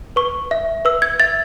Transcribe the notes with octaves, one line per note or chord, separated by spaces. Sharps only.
B4 C#6
E5
B4 E6
G#6
E5 A6